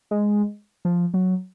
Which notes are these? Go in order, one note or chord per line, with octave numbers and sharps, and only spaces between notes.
G#3
F3
F#3